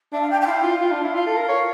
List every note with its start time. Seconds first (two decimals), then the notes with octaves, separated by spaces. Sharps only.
0.13 D4 E5
0.22 F5
0.30 D4 G5
0.41 G5
0.46 E4 F5
0.63 F4
0.81 F4
0.92 D4
1.03 E4
1.14 F4 F5
1.26 A4
1.37 A#4
1.48 C#5